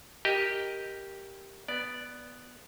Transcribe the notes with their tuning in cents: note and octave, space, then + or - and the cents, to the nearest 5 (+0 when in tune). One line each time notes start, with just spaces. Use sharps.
G4 +0 A#4 +0 D#5 +0
B3 +0 D5 +0